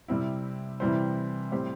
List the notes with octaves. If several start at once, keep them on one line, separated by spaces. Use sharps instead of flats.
C3 G3 C4 E4
C3 E3 G3 E4 C5
A2 G3 C4 G4 C5